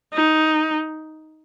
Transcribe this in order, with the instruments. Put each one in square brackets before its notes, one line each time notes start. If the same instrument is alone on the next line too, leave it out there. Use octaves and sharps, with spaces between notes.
[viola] D#4